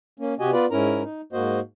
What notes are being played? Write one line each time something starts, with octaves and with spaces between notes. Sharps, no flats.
A#3 C#4
C3 F#4 G4 D#5 G#5
B3 F4 B4 D5
G#2 C#4 E4 A#4 A#5
D#4
G#2 A#3 F#4 C5 D#5